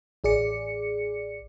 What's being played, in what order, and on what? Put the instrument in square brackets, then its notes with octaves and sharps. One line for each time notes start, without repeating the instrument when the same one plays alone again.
[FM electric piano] A1 G#4 D5 C#7